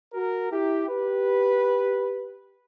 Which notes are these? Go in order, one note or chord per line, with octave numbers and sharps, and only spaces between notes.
F#4 A#4
E4 G4
G4 B4